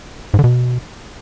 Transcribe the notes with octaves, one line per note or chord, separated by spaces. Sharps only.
G#2
D3
B2